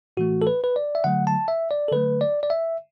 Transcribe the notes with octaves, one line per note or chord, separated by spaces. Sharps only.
A2 E3 A3 F#4
A4
B4
B4
D5
E5
D3 F#3 A3 F#5
A5
E5
D5
A4
D3 F#3 A3 B4
D5
D5
E5